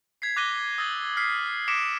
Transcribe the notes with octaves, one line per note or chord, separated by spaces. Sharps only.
G#6 B6 C7
D6 F#6 A#6 D#7 G7
D#6 E6 A6 A#6
F6 B6 C7
D6 A#6 B6 C#7 D7 E7